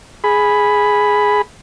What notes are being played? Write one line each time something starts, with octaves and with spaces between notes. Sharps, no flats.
G#4 B5